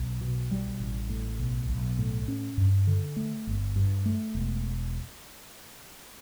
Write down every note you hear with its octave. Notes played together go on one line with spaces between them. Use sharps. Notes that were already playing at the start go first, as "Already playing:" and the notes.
Already playing: B1
B2
G3
A1
A2
B1
B1
A2
C#4
G2
D3
A3
G1
G2
A3
E1